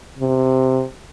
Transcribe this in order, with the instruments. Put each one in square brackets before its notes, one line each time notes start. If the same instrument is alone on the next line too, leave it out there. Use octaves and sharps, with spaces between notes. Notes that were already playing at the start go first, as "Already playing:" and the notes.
[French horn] C3